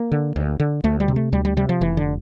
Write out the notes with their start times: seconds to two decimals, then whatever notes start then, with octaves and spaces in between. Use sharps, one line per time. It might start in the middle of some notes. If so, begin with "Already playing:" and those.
Already playing: A#3
0.12 D3
0.36 D2
0.60 D3
0.84 D2 A3
1.00 G3
1.08 C3
1.16 A3
1.32 D2 G3
1.45 G3
1.57 C3 G3
1.69 F3
1.81 F1 E3
1.97 D3